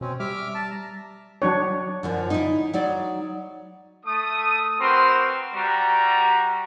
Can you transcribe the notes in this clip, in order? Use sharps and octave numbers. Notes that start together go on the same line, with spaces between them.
B2 C4 C#4
G3 E5 D6 F6
A5
A#5
F#3 D4 C#5
F#2 D3 F3
D#4 E4
F#3 D#4 D5
A3 D#6
C4 F#4 A#4 B4 C6
G3 F#4 A#5